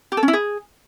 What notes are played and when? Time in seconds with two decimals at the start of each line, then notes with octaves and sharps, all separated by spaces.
0.12 G4
0.17 A4
0.23 C#4
0.28 E4
0.33 G#4